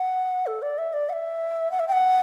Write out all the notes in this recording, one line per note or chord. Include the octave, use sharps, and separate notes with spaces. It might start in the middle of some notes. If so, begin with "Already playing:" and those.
Already playing: F#5
A4
D5
E5
D5
F#5
E5
F#5
E5
G5
F#5